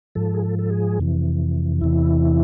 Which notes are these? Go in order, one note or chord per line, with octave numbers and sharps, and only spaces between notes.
G#2 F3 A4
G#4
A4
A4
G#4
F2 C3 E3
E2 C3 E3 E4